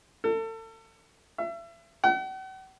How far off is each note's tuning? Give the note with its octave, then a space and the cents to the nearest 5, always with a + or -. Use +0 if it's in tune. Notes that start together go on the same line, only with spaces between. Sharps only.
A4 +35
E5 +35
F#5 +45